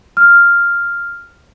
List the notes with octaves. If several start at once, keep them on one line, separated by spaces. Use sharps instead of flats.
F6